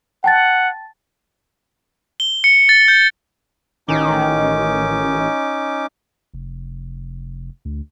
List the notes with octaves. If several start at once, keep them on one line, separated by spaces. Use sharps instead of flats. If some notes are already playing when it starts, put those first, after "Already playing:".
F#5 G5 A5 A6
G7
C#7
A6
G6
A1 D#3 C#4 D#4 D6
F1
D2